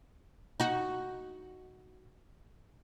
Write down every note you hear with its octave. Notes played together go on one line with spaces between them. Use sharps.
D#4 F#4